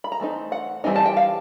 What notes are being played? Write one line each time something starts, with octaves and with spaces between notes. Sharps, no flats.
B5
A#5
E3 A3 C4 D#4
F#5
E3 G3 C4 D#4 G#5
A5
G5
F5